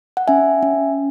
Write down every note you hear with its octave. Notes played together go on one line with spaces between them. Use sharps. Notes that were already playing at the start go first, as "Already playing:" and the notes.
F#5
C#4 E5 G#5
C#4